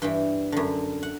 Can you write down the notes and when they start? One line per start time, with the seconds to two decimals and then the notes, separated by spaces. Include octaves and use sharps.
0.02 G2 E3 G5
0.52 F#2 D3
1.03 F#5